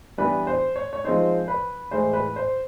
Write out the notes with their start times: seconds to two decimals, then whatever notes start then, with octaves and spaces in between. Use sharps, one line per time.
0.18 E3 G3 B3 D4 B4
0.47 C5
0.76 C#5
0.93 C#5
1.04 F3 G#3 C4 D#4 C5
1.48 B4
1.91 A2 E3 G#3 C5
2.13 B4
2.36 C5